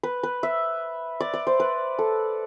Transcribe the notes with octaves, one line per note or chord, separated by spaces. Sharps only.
B4
B4
E5
D5
D5
C5
B4
A4